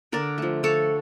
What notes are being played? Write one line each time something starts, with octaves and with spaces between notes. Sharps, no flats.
D3 A#4 D5
F3 A3
D3 A4 C#5